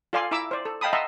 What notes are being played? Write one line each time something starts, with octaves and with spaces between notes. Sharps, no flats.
F4 A4 D5 F5 G#5 C6
E4 E5 A#5 D6 E6
C5 D5
A4
D#5 F5 G5 A5 B5 D#6
D#5 E5 F#5 A5 A#5 C6